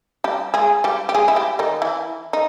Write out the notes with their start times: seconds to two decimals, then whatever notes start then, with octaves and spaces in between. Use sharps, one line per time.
0.24 G3 G4
0.54 G#3 G#4
0.84 G3 G4
1.09 G4
1.14 G#3 G#4
1.28 E4
1.36 G3 G4
1.59 D#3 D#4
1.82 E3 E4
2.33 D#4